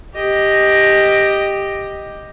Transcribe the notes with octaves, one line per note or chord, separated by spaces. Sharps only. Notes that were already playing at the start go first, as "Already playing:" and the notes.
G4 D#5